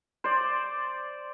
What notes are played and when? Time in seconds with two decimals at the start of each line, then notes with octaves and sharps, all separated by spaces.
0.24 C5 D5